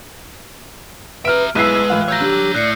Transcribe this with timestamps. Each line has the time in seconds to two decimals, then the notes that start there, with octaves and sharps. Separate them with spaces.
1.25 B4 E5 A#5 F6 D7
1.55 B1 G#3 E4 B4 E6 F#6 C7 D#7
1.90 A2 E3 F4
2.08 C#5 A#5 E6 G6 A#6
2.21 D3 G4
2.55 A2 D5 F#6 C7 C#7